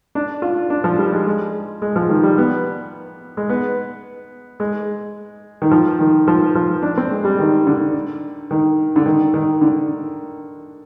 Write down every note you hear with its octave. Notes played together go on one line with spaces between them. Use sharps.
D4
F4
D4
F3
G3
G#3
G#3
G#3
F3
D#3
G3
B3
G#3
B3
G#3
D#3
F3
D#3
F3
F3
D4
C4
G#3
G3
D#3
D3
D#3
D3
D#3
D#3
D3